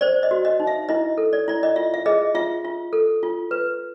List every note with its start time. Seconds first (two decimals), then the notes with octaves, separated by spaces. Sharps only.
0.01 C5 D5
0.23 D#5
0.31 F#4
0.45 D#5
0.60 D#4
0.67 E5
0.89 E4 D#5
1.18 A4
1.33 D5
1.48 E4 D5
1.63 D#5
1.76 F4 E5
1.94 E5
2.06 G#4 D#5
2.35 F4 E5
2.65 F4
2.93 A4
3.23 F4
3.51 B4